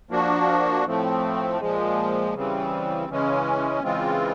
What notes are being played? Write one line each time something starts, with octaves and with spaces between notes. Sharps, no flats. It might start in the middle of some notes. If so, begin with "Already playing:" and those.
F3 A#3 D4 F#4
A2 F3 A3 C4
A#2 F3 G#3
C#3 E3 G3 C4
C#3 E3 G#3 C#4
C#3 E3 G#3 C4 F4